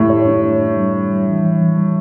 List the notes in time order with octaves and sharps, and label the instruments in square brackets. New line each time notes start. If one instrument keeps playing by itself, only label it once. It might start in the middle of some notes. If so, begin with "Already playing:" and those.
Already playing: [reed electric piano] F#2 G4 [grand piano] A2
[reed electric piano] C#5
D4
C#5
D4
G3
C#5
G3
E3
E3
E3
G3